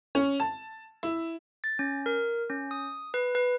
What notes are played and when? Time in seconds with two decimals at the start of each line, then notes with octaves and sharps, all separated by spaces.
0.15 C#4
0.40 A5
1.03 E4
1.64 A6
1.79 C#4
2.06 A#4
2.50 C#4
2.71 D#6
3.14 B4
3.35 B4